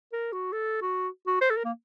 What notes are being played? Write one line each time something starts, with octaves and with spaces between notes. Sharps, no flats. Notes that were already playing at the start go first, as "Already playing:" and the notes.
A#4
F#4
A4
F#4
F#4
C5
A4
A#4
A#3